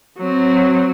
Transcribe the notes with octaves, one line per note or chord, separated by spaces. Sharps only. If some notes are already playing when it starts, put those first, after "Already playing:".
F#3 C4